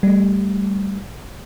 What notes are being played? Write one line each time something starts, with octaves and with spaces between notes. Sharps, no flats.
G3 A3